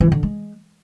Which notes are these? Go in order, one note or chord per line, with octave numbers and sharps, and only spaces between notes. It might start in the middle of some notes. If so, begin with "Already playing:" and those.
E3
D3
G#3